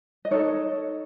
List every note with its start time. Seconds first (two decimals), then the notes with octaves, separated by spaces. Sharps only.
0.25 D#5
0.31 D#4 A4 C#5